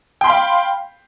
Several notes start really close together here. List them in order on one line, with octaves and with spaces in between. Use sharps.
G5 C6 B5 F5